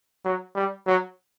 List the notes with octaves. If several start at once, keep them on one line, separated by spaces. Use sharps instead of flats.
F#3
G3
F#3